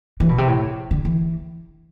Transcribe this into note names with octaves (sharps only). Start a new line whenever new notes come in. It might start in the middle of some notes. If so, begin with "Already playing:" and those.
E3
B2
C3
A2
D3
E3